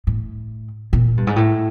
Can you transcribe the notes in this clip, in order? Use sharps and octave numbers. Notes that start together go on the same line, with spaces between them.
A2
A#2
G2
G#2
A2